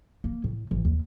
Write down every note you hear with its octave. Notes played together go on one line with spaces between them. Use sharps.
A#3
A2
A1
D#2